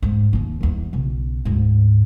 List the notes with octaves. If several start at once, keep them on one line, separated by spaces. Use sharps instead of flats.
G#2
D#2 A#3
G1 E2
B1 C#3
D2 G#2